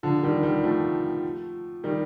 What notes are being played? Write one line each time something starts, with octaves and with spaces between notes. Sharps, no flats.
D3 F3
D#3 G3
D#3 G3
F3 A3
D#3 G3